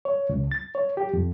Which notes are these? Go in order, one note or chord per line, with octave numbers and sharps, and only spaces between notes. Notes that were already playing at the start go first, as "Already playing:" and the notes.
C#5
C#2
A6
C#5
G4
F2